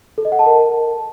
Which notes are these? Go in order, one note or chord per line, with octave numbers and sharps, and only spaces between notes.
A4
D#5
F#5
A5
A#4